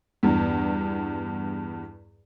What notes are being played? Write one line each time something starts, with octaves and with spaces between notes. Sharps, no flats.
E2 G2